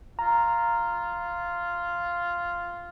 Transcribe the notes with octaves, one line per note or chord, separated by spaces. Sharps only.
F4 A#5